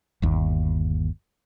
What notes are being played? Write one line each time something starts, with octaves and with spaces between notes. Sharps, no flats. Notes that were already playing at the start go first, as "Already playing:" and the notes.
G1 D#2